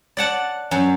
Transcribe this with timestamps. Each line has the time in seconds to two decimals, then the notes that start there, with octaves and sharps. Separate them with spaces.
0.17 D5 F#5 A5
0.71 F#2